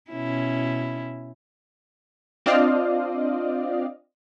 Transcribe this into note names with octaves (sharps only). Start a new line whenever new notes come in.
B2 C#4 E4
C4 D4 F4 D5 D#5 F5